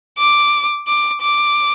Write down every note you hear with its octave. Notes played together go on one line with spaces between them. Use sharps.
D6
D6
D6